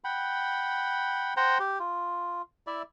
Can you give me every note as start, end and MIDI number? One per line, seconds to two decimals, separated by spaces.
0.04 1.34 78
0.04 1.34 79
0.04 1.34 83
1.37 1.58 72
1.37 1.58 78
1.37 1.58 79
1.37 1.58 82
1.60 1.79 67
1.79 2.42 65
2.67 2.82 64
2.67 2.82 74
2.67 2.82 76